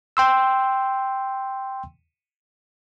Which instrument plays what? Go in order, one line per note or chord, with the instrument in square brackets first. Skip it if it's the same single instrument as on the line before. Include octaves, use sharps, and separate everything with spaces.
[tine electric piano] G5 C6 E6